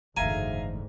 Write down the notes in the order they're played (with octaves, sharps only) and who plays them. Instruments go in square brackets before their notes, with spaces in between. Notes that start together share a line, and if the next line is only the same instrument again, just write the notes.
[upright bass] F#1 E3 [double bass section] D2 G#2 [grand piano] E5 F5 A#5 [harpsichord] G#5